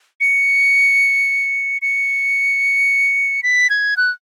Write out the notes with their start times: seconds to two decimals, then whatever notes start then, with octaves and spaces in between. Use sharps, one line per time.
0.20 C#7
1.82 C#7
3.43 B6
3.70 G#6
3.97 F#6